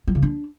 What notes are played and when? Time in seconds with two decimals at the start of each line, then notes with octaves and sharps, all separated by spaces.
0.08 F#3
0.15 C#3
0.22 D4